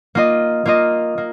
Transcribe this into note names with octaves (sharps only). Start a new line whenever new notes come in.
A#3 F4 D#5
A#3 F4 D#5
A#3